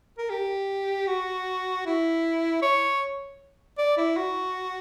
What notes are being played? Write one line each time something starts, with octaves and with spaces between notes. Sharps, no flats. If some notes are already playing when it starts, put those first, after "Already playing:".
A#4
G4
F#4
E4
C#5
D5
E4
F#4